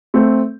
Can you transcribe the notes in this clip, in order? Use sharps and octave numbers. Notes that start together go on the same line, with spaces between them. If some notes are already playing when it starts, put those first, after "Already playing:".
A3 C4